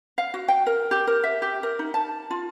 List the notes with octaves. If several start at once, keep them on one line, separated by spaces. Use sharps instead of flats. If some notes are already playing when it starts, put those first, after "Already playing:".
F5
F#4
G5
A#4
G4
A#4
E5
G4
A#4
D#4
A5
F4